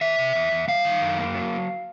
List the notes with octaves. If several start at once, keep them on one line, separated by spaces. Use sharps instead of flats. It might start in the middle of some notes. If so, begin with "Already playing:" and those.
D#3 E5
C3
E2
E2
G3 F5
D#3
F#2
A#3
F#3